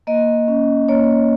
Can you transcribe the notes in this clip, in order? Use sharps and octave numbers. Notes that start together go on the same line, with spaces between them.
A#3 D#5
C#4
A#3 C#5